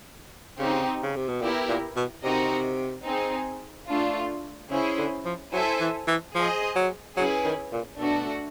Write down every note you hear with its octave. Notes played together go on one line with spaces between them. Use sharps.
C#3 C4 D#4 G4
C#3
C3
B2
A#2 B3 E4 G4 A#4
A#2
B2
C3 C4 D#4 F#4 A#4 D#5
C4 D#4 G#4
A3 D4 F4
C#3 C#4 E4 G#4 C5
D3
F3
F#3 E4 A4 C5 E5 G#5
E3
E3
F3 G#4 C5 D#5
F#3
F#3 C#4 E4 G#4 B4
D#3
A#2
B2 A3 D4 F#4